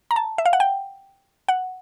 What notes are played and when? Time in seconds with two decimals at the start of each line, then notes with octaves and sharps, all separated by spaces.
0.11 A#5
0.16 A5
0.38 E5
0.46 F5
0.53 F#5
0.60 G5
1.48 F#5